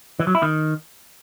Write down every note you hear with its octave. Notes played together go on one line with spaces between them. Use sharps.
E3
F#3
E4
D#3